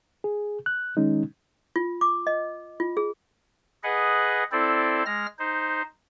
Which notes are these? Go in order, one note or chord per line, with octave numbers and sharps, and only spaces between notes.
G#4
F#6
D#3 G#3 C#4 D#4
F4
D6
D#5
F4
G#4
G#4 B4 D#5 F#5
C4 E4 A4 C5 D5
G#3 F6 A#6
D#4 C5